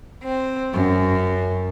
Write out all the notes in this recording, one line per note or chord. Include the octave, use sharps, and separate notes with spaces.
C4
F#2